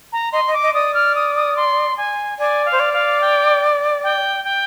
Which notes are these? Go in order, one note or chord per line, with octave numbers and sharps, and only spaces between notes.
A#5
D#5 C6
D#5
D6
D#5
D5 D#6
F6
D#6
D#6
C6
G#5
D5 G#5
F5
C5
D5
F5
G5
G5
G5